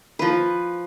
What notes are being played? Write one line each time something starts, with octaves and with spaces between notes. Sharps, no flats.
F3 B4